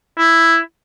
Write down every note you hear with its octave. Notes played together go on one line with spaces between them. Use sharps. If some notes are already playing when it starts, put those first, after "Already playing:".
E4